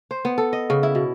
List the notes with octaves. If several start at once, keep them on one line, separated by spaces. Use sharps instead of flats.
C5
B3
A4
D#5
C#3
E4
B2